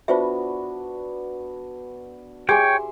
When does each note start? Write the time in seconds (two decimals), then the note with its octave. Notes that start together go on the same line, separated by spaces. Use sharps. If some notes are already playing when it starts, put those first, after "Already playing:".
0.08 B3 D4 F4 F#4 C5 E5
2.49 G4 G#4 C#5 E5 G5 G#5 C6